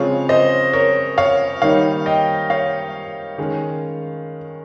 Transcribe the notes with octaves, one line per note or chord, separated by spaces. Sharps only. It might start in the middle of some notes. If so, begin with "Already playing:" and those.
Already playing: C#3 F3 G#3 C4 C#5 F5
C5 D#5
A#4 C#5
C#5 F5
D#3 G3 A#3 D#4 C#5 F5
D#5 G5
C#5 F5
D#3 G#3 C#4